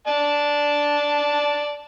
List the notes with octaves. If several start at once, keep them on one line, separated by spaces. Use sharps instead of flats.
D5 A5